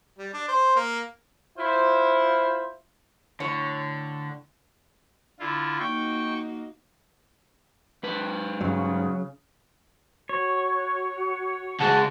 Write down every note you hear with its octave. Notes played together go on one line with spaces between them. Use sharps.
G3
D4
C5
A#3
E4 F4 C5
A2 D3 C#5
D3 E4 F4
A#3 D#4 F#4 G5 C#6
G#2 B4
G2 C#3 F#3
F#4 C#5
C#2 G#3 F#5 A5